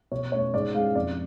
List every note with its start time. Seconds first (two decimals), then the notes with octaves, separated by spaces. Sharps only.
0.11 B2 C#5
0.32 A3 C#4 C#5
0.54 G#2 D5
0.75 G#3 C#4 F5
0.95 F2 D5